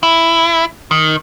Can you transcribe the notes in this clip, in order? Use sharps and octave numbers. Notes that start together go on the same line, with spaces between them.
E4
D#3